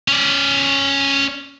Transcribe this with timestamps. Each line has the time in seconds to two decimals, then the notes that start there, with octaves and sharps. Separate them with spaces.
0.08 C#4 D5